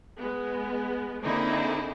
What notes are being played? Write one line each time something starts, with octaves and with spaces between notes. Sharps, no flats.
G#3 B3
D3 A#3 C4 D#4 E4 G#4